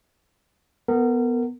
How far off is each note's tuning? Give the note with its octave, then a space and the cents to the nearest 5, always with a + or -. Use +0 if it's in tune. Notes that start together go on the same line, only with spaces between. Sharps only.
B3 +0 A#4 -30